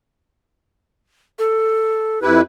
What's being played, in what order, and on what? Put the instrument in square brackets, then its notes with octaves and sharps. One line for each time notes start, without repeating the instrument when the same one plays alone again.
[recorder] A4
[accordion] F2 E4 B4 [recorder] G4